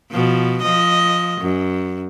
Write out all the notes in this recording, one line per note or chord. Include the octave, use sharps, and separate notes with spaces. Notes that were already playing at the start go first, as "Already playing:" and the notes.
B2 F3
F3 D#5
F#2